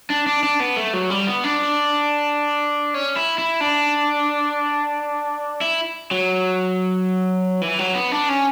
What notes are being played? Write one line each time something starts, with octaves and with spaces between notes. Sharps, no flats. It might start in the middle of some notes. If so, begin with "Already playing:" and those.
D4
D4
D4
B3
A3
F#3
G3
B3
D4
C#4
E4
E4
D4
E4
F#3
E3
F#3
B3
D4
C#4